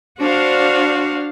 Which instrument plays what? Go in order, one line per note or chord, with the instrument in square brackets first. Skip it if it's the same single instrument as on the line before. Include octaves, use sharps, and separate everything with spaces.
[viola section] D4 C5 F5 [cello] F#4